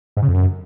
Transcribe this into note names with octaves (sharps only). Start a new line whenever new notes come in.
G#2
C#3
F2
F#2